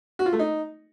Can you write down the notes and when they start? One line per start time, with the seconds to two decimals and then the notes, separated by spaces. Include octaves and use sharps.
0.19 F#4
0.26 F4
0.33 A3
0.39 D#4